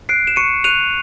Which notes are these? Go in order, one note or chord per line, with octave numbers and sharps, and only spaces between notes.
F#6 C7 D7
E7
C#6 C#7 D#7
F#6 D#7 F7